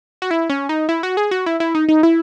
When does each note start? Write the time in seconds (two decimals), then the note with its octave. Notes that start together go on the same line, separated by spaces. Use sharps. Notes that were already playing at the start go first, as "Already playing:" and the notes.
0.22 F#4
0.31 E4
0.50 C#4
0.69 D#4
0.89 E4
1.03 F#4
1.17 G#4
1.31 F#4
1.46 E4
1.60 E4
1.75 D#4
1.89 D#4
2.03 E4